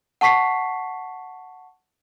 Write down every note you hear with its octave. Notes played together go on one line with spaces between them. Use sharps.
F#5 A5 C#6 B6 C7